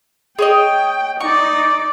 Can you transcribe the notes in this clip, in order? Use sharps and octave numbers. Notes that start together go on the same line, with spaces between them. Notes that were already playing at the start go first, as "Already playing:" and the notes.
G#4 C#5 D#5 G5
D#4 D5 C#6